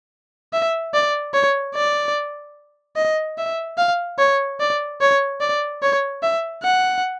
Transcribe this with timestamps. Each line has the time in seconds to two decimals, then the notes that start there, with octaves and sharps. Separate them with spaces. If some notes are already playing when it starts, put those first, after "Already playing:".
0.53 E5
0.94 D5
1.33 C#5
1.75 D5
2.96 D#5
3.38 E5
3.78 F5
4.19 C#5
4.60 D5
5.01 C#5
5.41 D5
5.82 C#5
6.23 E5
6.63 F#5